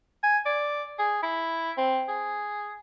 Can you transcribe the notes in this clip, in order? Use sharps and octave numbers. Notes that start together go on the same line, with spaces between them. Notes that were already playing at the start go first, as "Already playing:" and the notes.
G#5
D5
G#4
E4
C4
G#4